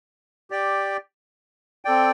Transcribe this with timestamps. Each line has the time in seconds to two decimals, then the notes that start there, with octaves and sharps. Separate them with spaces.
0.50 G4 D5 G5
1.85 C4 A4 D5 G5